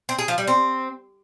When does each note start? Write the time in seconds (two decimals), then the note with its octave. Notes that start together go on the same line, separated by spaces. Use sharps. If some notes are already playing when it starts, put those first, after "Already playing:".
0.09 C4
0.18 G#4
0.28 F3
0.38 G3
0.47 C4